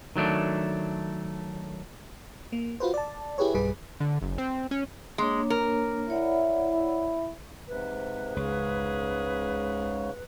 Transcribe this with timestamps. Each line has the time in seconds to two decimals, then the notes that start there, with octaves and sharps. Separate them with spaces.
0.16 D#3 F#3 A3 D4
2.52 A#3
2.80 F4 F#4 B4 C5
2.94 D5 A5
3.38 E4 G4 G#4 B4 C#5
3.54 B1 G2 G3 G#4 B4
4.00 D3
4.22 F#1
4.38 C4
4.71 C#4
5.18 G#3 A#3 D4 C#5
5.50 A#4
6.10 E4 C#5 D5 F#5
7.68 G#2 C3 B4
8.36 C#2 G#2 C#3 G#4 C#5